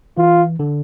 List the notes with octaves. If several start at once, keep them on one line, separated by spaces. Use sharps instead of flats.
E3 F4
D3